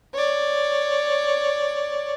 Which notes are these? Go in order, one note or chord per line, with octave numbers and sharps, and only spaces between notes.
C#5 D5